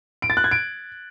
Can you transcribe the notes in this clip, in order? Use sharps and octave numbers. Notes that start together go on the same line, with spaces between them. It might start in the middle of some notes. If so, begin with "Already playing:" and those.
D7
A6
F#6
G#6
D7